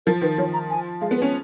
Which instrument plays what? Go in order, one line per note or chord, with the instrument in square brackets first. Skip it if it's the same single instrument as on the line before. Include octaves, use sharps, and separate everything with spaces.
[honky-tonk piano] F3 [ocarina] A#4
[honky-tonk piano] D#3 [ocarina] B4
[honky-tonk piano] F3 [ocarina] C#5
[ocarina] A#5
G#5
[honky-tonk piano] G#3 [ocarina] F5
[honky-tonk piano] B3
[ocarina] B4
[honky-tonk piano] C#4